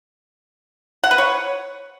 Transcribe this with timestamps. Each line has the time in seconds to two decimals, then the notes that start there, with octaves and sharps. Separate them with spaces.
1.04 F#5
1.11 B4
1.18 C#5